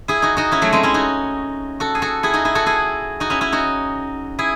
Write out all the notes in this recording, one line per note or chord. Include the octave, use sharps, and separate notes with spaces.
E4 G#4
D#4 F#4
D#4 F#4
C#4 E4
F#3 A3
G#3 C4
C#4 E4
D#4 F#4
F#4 A4
G#4
F#4 A4
E4 G#4
D#4 F#4
E4 G#4
F#4 A4
E4 G#4
D#4 F#4
C#4 E4
C#4 E4
D#4 F#4
E4 G#4